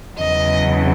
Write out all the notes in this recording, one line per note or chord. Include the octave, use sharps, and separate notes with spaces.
E2 C#3 F#3 D#5